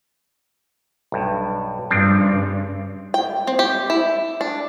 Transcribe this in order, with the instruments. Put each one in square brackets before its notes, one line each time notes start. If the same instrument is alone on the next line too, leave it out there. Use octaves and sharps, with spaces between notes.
[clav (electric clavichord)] B1 G2
[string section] G2 C#3 [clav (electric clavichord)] F3 C4 D4
[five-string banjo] G5
C4
G4
E4
D4